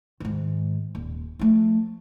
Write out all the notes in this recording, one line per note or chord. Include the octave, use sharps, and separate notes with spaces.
G#2 D#3
D#1
F3 A3